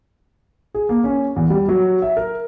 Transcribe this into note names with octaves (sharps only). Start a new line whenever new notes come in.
G#4
A#3
C#4
E2
G3
F#3
E5
A#4